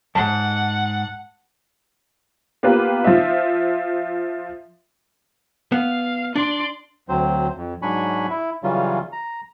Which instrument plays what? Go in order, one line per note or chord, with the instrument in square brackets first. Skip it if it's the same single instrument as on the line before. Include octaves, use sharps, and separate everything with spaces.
[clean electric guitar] F2 G#2 [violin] F#5 [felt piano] A5
[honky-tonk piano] A#3 B3 F4 G4 B4 F5
F3 F4 E5
[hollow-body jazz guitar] B3 [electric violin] F5
[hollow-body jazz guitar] D4 [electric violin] D5 C6
[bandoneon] D2 F#3 C4 C5
F2
G#2 F#3 D4 G#5 B5 C#6
E4
C#3 E3 F#3 G3 C#4 F4
A#5